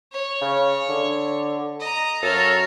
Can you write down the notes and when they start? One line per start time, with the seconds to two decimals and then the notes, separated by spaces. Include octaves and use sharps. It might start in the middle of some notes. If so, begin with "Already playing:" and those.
0.12 C#5
0.42 C#3
0.89 D3
1.80 D#5 A#5
2.23 F#2 A4 C#5 F5 A#5